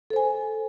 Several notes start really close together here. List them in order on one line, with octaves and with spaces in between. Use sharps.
A4 C5 G#5